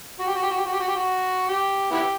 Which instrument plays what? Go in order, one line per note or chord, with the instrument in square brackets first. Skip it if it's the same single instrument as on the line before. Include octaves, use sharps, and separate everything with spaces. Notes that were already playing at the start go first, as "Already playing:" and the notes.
[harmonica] F#4
G4
F#4
G4
F#4
G4
F#4
G4
F#4
G4
F#4
G4
B3 E4 G4